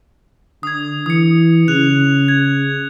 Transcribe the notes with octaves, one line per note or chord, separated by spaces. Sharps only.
D3 D#6 G#6
E3 D#6 C#7
C#3 F#6 F7
G#6